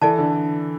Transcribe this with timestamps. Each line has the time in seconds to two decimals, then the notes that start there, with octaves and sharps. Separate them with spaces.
0.01 E3 A4 D5 A5
0.18 D3